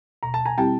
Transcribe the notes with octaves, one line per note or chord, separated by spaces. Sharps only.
B2 A#5
A5
G#5 A#5
G3 C4 E4 G4 G5 A5